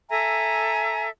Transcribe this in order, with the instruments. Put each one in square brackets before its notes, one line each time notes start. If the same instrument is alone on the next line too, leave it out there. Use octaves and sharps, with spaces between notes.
[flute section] A4 E5 G#5 A#5